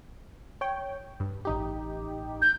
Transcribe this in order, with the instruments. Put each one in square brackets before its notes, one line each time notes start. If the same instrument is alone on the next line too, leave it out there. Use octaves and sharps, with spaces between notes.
[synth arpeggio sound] C#5 G5
G2
A1 D#4 G4
[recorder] G6